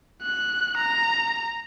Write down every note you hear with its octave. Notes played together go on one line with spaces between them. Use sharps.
F#6
A#5